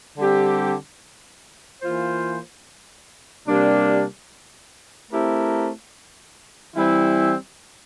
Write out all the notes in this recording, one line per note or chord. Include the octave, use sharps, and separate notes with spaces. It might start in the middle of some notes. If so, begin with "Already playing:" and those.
D3 G3 C4 G4
E3 A#3 F4 C5
C3 G3 A#3 D4
A3 C4 E4 G4 A#4
E3 G3 C4 E4